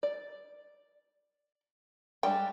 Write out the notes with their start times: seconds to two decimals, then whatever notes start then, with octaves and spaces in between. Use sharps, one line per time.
0.03 D5
2.23 G3 G#3 D4 G5